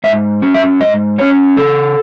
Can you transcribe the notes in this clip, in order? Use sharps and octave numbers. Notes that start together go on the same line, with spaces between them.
G#2 E5
F#3 C#4
E5
G#2 D#5
F#3 C#4 C#5
C#3 A4